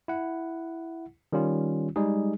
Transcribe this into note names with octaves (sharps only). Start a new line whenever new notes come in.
E4 F#5
D#3 G3 C#4 F4
G3 G#3 D#4 G#4